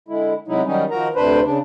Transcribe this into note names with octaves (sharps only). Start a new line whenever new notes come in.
D3 G#3 E4
C3 F#3 G#3 D#4 E4
D#3 F#3 G3 C#4 D#4
D#3 F3 F#4 A#4 A#5
D2 C3 D4 B4 C5
C#3 D4